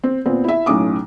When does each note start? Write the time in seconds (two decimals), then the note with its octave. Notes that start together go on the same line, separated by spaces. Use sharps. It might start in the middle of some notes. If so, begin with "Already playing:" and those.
0.04 C4
0.26 A#2 B3 C4
0.44 E4 E5
0.66 B1 A2 C#4 D6 D#6